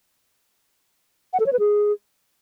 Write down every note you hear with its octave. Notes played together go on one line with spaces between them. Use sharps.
F#5
A4
C#5
B4
G#4